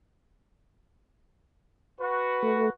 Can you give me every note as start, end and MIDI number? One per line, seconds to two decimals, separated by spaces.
2.01 2.70 66
2.01 2.70 71
2.43 2.70 57